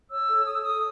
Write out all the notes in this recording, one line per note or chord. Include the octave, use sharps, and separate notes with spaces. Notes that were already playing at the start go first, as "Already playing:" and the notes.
C#5 E6
A4
A4 D#6
E6
A4 D#6